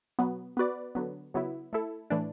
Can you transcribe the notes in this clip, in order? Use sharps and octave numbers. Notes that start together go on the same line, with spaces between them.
B2 F#3 B3
B3 F#4 B4 D5
D3 F#3 B3
C#3 F#3 B3 E4
A3 E4 A4
A2 E3 A3 D4